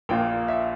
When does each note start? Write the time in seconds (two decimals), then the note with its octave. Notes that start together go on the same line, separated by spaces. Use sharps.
0.09 A#1 A#2 A#3 G5
0.48 E5